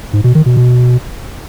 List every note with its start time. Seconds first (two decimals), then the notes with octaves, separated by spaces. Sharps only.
0.13 G#2
0.24 B2
0.35 D#3
0.46 B2
0.57 B2